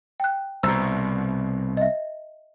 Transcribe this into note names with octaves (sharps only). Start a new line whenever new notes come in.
G5 F#6
C2 B2 C5 A#5 E6
D#5 E5